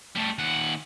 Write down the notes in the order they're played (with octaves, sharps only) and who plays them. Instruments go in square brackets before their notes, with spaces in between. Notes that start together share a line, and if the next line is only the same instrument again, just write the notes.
[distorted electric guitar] G3 A3
D#2 F#5